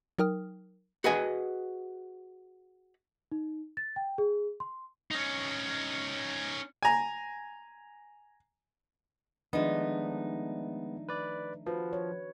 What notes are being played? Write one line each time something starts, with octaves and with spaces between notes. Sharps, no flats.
F#3 D#4 A#4 G5 D#6 F6
F#4 G#4 B4 D#5 G#5
D#4
A6
G5
G#4
C6
C#4 D#4
G#5 A#5
D#3 F3 G#3 A3 B3 D4 D#4
B4 D5
F3 F#4 B4
C#5